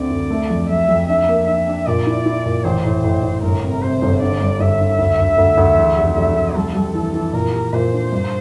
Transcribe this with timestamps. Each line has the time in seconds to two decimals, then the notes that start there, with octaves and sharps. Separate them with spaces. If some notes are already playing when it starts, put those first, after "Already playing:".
Already playing: D2 D3 C4 D5
0.10 D2
0.30 A3
0.50 F2
0.69 F2 E5
0.89 F2
1.08 D4 E5
1.28 A#3
1.47 D4 E5
1.68 D4
1.87 A#2 D5
2.07 E4
2.26 E4
2.46 A#2
2.64 A1 C5
2.85 A2
3.04 A2
3.23 A2
3.43 G1 A#4
3.63 C3
3.82 C3 C5
4.02 G1
4.21 D3 D5
4.41 G2
4.60 G1 E5
4.80 D3
4.99 D2
5.20 D2
5.38 D2
5.57 D2
5.78 E2
5.98 F1
6.16 F1 E5
6.36 F1
6.56 G3 A4
6.75 G3
6.94 E3
7.14 E3
7.33 A#2 A#4
7.53 G4
7.73 A#2 C5
7.93 D4
8.12 G2